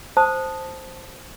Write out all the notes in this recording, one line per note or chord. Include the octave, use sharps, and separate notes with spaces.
C5 A5 D#6